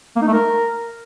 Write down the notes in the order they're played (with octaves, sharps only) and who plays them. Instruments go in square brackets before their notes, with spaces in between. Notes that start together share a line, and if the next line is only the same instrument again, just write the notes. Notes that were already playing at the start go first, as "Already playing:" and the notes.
[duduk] A#3
D#4
A3
A#4